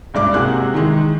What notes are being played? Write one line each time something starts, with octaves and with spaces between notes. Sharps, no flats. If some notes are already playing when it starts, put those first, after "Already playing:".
C#2 G2 D5 D6
C3 G#3 A#3 F#4 G#4 F#6
D#3 E3 G#3 D#4